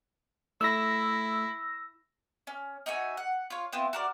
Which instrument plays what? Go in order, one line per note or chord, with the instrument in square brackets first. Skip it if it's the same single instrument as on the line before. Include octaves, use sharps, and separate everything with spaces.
[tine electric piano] A3 [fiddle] E4 [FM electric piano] E6 A#6
[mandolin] C#4
D#4 F#4 E5 G#5
F#5
F4 C#5
B3 C4 E4 F4
F#4 A#4 D5